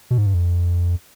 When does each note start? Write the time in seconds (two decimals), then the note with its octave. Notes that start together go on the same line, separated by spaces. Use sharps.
0.11 B2
0.18 G#2
0.26 G2
0.34 F2